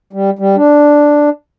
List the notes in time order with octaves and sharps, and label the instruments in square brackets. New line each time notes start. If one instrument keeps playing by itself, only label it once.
[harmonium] G3
G3
D4